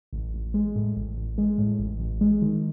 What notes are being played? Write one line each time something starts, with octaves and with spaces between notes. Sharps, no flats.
A1
A1
G#3
A2
A1
A1
G#3
A2
A1
A1
G#3
D#3